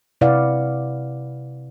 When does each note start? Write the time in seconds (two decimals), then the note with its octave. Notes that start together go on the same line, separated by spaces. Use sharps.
0.21 C3 E4 B4 D5 F5 F#5